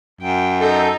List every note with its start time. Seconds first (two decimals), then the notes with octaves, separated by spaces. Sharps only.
0.21 F#2 G5
0.60 D#4 A4 G6